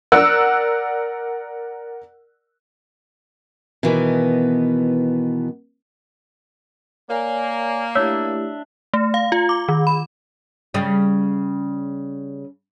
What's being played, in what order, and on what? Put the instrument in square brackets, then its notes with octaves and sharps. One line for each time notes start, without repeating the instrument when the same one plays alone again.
[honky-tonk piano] A#4 D5 F#5 E6 F#6
[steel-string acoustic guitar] B2 D#3 E3 B3
[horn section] A#3 [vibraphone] C#5 D5 G#5
[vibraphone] A3 E4 G4 [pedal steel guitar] D4 E5 [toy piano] C#5
[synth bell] A3
F5
F4
D6
D#3
B5
[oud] C#3 G3